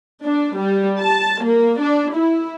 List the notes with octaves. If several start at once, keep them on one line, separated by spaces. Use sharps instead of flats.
D4
G3
A5
A#3
D4
E4